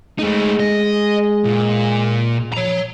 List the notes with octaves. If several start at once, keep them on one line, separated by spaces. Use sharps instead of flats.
G#3 A3 D#4
D#5
A#2
C#5 A#5